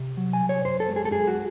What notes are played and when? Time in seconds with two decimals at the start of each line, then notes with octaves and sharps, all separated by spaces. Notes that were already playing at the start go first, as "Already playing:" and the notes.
Already playing: C3
0.17 F#3
0.33 G#5
0.41 C2
0.49 C#5
0.65 F#2 C5
0.80 A4
0.89 G#3
0.96 G#4
1.05 A4
1.12 F#2 G#4
1.27 F#4